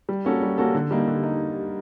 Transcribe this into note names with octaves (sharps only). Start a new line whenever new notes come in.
G3
A#3 C#4 F#4 A4
G3
A#3 C#4 F#4 A4
D3
G3 A#3 D#4
D3
D#4